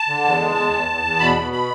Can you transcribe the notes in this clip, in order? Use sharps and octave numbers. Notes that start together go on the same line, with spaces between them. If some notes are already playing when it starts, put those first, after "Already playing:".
Already playing: A5
D3
E2
G#3
E2
E2
E2
E2
B2 B5
B2
B5